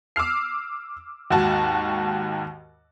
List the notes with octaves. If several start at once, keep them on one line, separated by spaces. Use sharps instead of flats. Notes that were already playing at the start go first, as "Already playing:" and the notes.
D6 E6 F6 C7
D#2 G#2 F#4 A5